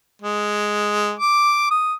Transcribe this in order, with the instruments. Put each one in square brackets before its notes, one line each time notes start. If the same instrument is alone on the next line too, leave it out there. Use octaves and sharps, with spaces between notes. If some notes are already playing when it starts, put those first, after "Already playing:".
[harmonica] G#3
D6
D#6